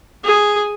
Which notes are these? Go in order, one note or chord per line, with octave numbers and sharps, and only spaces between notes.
G#4